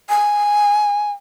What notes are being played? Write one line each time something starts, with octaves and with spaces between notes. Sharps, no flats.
G#5